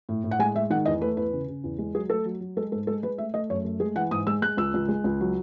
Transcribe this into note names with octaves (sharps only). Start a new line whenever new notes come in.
A2
A2
F#5
G#3 G#5
G#3 E5
D#3 F#5
E2 D#5
A3 B4
E2 B4
C#3
C#3
E2
G#3
F#3 G#4
A3 A4
F#3
F#3
G#3 A4
G#2 A4
G#3 A4
G#3 B4
A3 E5
A3 D#5
F#2 C#5
A3
G#3 G#4
E3 F#5
G#2 D#6
G#3 E6
G#3 F#6
C#2 E6
C#2
G#3
C#2
F#3